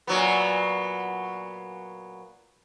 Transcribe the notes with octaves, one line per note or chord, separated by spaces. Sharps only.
A#2 F#3 B3